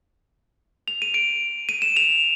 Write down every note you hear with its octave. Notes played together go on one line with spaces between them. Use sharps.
F7
D#7
D7
D#7
E7
F7